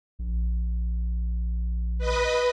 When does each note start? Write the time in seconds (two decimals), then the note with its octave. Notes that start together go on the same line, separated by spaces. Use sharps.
0.19 A#1
1.98 B4 D#5 B5